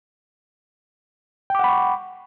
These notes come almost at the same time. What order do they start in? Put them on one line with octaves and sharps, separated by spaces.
G5 D6 F#5 B5 C#6